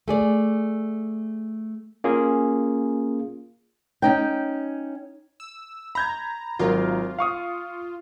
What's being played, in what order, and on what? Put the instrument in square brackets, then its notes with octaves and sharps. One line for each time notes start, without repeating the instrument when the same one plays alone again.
[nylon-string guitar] A3 G#4 D5
[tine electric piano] A#3 C#4 F4 G#4
[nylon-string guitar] C#4 D#4 G5
[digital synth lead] E6
[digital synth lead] A#5 [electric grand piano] B5 G6 G#6
[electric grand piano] G#1 F#3 A#4 [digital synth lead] F4
[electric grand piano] F5 C#6 D#6